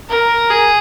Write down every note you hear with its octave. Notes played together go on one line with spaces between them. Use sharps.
A#4
G#4